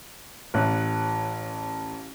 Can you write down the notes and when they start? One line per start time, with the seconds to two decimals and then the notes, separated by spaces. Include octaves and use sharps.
0.54 A1 C#5 F#6